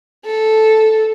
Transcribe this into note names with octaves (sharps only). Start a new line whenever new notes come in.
A4